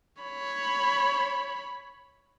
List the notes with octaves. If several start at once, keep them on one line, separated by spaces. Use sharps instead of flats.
C#5 B5